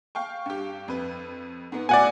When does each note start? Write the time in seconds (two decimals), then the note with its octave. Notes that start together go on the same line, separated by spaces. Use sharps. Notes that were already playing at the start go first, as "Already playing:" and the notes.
0.15 F5 G5 C#6
0.46 G2 G4
0.88 F2 B4
1.72 G#2 B3
1.89 B2 A3 E4 D5 F#5 G#5